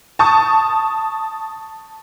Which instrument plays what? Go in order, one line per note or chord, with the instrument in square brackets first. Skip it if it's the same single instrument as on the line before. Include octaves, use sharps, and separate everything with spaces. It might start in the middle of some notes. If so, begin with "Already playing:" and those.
[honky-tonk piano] A5 C#6 D#6